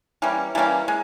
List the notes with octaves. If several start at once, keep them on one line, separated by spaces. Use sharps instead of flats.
E3 G3 A#3 C#4
E3 G3 A#3 C#4
G#3